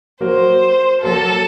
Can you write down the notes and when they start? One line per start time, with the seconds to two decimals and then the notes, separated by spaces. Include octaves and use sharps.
0.21 F#3 A#3 F#4 A#4 C5
1.01 F#3 A#3 F#4 A4 A#4